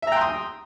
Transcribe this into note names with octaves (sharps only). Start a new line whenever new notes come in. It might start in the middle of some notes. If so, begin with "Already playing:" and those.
E5 G5 A#5 C6 D#6